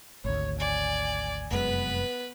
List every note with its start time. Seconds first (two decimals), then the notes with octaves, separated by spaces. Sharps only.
0.25 G#1 D2 C#5
0.60 D5 G#5
1.51 F1 F#2 G#3 B3 B4